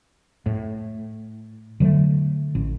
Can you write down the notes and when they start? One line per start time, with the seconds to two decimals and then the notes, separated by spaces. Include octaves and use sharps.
0.46 A2
1.80 D3 F#3 G#3 A3
2.55 A1